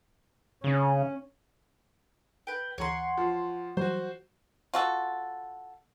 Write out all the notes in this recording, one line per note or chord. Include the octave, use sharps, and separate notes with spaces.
C#3 C#4
B4 G5
D2 E3 C#5 F#5 A#5 C6
F3
E3 F#3 G3 F#4 C5
F4 F#4 A4